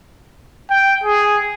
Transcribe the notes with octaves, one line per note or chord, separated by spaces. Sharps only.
G5
G#4